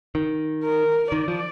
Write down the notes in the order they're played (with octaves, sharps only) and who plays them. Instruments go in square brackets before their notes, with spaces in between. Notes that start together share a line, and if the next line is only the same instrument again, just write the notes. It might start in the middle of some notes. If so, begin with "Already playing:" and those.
[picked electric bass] D#3
[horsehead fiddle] A#4
[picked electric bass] D#3 [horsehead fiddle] D5
[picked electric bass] F3